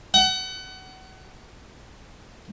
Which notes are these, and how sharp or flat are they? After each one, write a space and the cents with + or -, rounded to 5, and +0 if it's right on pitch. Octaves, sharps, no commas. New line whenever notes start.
F#5 +30